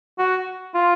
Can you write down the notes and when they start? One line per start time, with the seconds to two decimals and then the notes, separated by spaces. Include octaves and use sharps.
0.19 F#4
0.74 F4